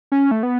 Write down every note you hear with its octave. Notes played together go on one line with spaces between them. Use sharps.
C#4
A3
B3